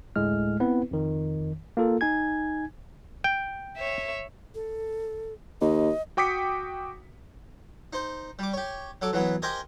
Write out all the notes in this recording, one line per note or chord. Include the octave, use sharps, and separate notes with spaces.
D2 A2 G#3 F6
B3 C4 E4 B4
F2 D#3
A#3 F4 A4
D#4 G#5 G#6
G5
C#5 E5
A4
D#2 D#5
F#4 G5 D6 D#6 B6 C#7
D#4 C5
G3 D6
G4 C#5
F#3 A4 D6
E3 F#3 B3
G4 A#4 C5 D#5 G#5